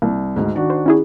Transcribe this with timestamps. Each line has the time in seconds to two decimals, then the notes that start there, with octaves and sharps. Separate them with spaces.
0.02 C2 A#3
0.36 D2 G#2
0.55 D#3 D4 F#4
0.70 C5
0.86 C#4 E4 G#4